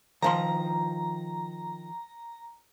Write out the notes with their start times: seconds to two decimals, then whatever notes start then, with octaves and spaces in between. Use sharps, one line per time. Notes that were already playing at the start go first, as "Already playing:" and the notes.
0.22 D#3 F3 A#5 C6